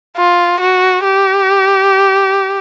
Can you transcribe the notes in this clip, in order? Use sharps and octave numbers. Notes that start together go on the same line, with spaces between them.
F4
F#4
G4